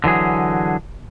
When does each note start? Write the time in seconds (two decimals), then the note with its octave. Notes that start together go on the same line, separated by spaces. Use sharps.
0.04 D3 E3 F#3 G#4